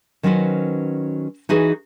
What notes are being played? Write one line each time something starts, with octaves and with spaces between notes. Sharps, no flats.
D#3 F#3 C#4 F#4 B4 C5
E3 D#4 F#4 G#4 B4